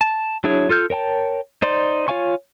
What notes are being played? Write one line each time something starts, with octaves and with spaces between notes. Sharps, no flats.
A5
F#3 D4 E4 G#4 C#5
F4 A4 F6 G6
A#4 C#5 G5 A5
D#4 C5 D5 C6
F4 C#5 F5 G#5 C#6